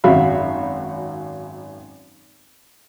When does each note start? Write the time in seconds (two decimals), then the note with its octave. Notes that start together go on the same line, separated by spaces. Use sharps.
0.04 G#1 F#2 F#4 E5 F5 B5